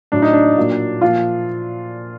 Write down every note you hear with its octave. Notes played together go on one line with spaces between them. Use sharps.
A2 F#3 D4
D#4
D4
A#2 F#3
A#2 F3 F4